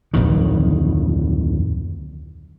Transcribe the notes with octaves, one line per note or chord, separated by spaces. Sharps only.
D1 G1 F2 D#3